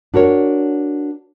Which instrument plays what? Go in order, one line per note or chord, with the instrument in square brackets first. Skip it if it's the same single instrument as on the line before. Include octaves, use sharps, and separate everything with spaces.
[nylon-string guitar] D4 F#4 A#4 C#5